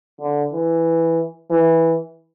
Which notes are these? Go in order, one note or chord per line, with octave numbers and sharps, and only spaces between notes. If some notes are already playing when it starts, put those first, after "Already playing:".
D3
E3
E3